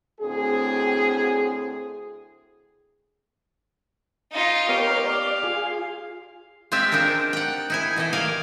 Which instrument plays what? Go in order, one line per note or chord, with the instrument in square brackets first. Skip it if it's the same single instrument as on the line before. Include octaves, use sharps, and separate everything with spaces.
[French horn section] D2 A2 C4 G#4
[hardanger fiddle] D#4 F4
[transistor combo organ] B3 A#4 C#5 [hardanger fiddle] G4 [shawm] F5
[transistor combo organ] D5 [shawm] F5
[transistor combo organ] F4 G#4
[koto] G#3 C4 F4 G4 E5
C4 D4 D#4 F4 A#4
F#5 G5
D#4 E4 G#5
B2 E3 A4 D#5
D#3 A#4 D5 F5 G#5